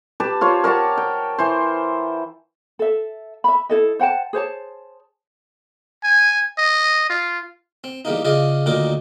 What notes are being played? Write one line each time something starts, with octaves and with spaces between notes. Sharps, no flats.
G4 B4 A5
F4 C5 C#5
A#4 C#5 F#5 A5
G5
E3 C5
A4 E5
E5 B5
E4 A4 D#5
C5 F#5 G5 A5
G#4 C5 C#5 A5
G#5
D#5
F4
C4
E2 G3 A#3 D#4
C#3 F4 G#4 D5 D#5
D2 A#2 D#3 D#4 A#4 D6